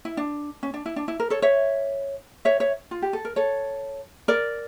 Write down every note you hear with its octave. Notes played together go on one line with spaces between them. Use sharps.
E4
D4
C#4
D4
E4
D4
E4
A#4
A4 C#5
C#5 E5
C#5 E5
C#5 E5
F4
G4
A4
A#4
A4 C#5
A#4 D5